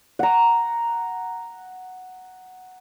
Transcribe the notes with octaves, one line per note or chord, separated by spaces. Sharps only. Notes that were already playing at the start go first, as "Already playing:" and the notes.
F#5 A#5